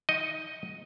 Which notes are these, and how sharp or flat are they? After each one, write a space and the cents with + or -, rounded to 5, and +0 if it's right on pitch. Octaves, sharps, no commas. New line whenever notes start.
D#4 +25 D#5 +0